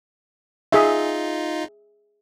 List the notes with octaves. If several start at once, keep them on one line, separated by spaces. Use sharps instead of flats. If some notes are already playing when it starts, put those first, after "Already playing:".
D#4 F4 G#4 E5